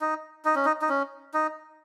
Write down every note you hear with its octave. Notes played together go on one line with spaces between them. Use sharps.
D#4
D#4
C#4
D#4
D#4
C#4
D#4